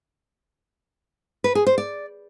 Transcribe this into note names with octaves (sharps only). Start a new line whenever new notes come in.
B4
G#4
C5
D5